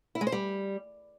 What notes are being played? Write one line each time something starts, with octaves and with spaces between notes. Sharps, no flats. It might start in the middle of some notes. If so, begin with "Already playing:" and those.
E4
G#3
C5
G3